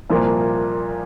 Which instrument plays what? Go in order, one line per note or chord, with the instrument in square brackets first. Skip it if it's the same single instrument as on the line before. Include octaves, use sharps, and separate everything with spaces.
[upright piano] C2 A#2 F3 A#3